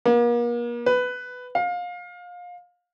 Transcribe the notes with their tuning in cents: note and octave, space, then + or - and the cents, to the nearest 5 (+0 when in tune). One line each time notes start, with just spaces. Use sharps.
A#3 +40
B4 +10
F5 +25